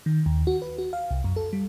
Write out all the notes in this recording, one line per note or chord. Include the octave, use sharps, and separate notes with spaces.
D#3
D#2
F#4
B4
F#4
F5
C2
F#2
A4
G3